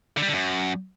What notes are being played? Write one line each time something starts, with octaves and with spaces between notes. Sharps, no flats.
D3
G3
D3
F#2